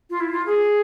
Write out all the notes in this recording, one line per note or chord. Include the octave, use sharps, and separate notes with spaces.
F4
E4
F4
G#4